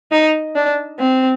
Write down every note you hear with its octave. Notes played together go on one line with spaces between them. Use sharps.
D#4
D4
C4